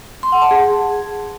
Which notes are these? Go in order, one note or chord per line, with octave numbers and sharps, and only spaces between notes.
C6
F#5
A5
G#4